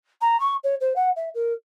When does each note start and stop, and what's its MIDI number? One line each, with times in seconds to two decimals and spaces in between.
0.21 0.39 82
0.40 0.55 85
0.63 0.75 73
0.80 0.93 72
0.96 1.10 78
1.16 1.29 76
1.34 1.53 70